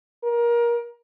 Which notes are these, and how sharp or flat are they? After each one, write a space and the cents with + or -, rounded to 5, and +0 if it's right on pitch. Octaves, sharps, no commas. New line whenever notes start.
A#4 +25